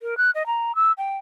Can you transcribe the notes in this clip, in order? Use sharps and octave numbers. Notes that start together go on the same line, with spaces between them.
A#4
F#6
D#5
A#5
E6
G5